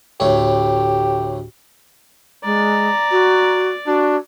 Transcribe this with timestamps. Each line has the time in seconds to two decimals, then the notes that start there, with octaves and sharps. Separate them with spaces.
0.20 D2 A2 G4 C#5
2.44 G#3 D5 A#5
3.11 F#4
3.87 D4 F#4